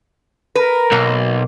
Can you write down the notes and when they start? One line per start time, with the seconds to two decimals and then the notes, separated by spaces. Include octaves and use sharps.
0.55 A#4 B4
0.92 B1 A#3